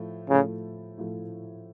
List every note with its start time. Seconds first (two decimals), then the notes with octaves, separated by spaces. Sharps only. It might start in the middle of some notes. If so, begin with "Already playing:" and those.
Already playing: A2 F3 A3
0.29 A2 C#3 F3 A3
0.97 A2 F3 A3